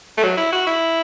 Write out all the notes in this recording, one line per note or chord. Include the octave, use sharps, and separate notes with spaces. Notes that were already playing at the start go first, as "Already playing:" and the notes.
A3
F#3
E4
F#4
E4